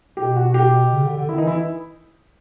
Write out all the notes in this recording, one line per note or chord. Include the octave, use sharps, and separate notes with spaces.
B2 G4
F#4
G4
C#3
D3
D3
D#3 E4
D#4
E3
E4